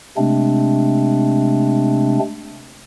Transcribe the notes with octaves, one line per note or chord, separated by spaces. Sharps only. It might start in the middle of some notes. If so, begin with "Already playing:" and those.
C3 G#3 A3 C4 D4